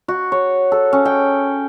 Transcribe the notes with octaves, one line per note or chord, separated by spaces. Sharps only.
F#4
C#5
A4
C#4
G5